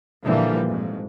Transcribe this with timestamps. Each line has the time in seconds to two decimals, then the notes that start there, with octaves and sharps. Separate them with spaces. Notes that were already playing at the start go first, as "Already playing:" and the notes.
0.24 A#2 D3 E3 F3 G3 A#3
0.68 F2 G#2